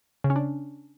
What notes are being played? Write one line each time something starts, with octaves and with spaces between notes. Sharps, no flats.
C#3
C#4
D4